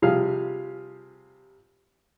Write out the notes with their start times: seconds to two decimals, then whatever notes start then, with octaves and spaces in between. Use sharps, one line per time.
0.02 C3 F3 G3 G#4 F5